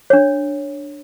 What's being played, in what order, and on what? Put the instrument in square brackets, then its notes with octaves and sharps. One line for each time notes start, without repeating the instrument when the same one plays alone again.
[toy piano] D4 C#5